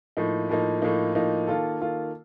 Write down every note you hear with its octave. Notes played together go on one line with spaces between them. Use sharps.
A2 F3 A#3 D#4
A2 F3 A#3 D#4
A2 F3 A#3 D#4
A2 F3 A#3 D#4
D#3 A#3 F4 A4
D#3 A#3 F4 A4